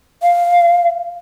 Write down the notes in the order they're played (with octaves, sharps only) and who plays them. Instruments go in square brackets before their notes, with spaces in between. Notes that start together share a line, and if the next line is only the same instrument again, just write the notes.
[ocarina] F5